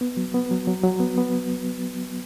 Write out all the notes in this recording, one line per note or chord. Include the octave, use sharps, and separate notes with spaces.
B3
F#3
B3
F#3
F#3
F#3
B3
B3